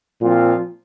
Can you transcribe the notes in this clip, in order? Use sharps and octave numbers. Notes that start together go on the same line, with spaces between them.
A#2 F3 C4 F4